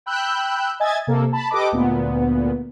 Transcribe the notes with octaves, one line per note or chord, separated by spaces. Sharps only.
G5 B5 E6 F#6 G6
D#5 E5 G#5 G#6 A6
C3 A#3 A4
A5 B5
G4 A4 B4 D#5 D6
D2 A#2 B3